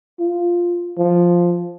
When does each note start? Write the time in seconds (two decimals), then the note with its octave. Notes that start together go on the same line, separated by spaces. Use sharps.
0.20 F4
0.98 F3